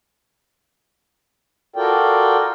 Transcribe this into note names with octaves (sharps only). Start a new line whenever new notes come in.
F4 F#4 A4 A#4 D5 G5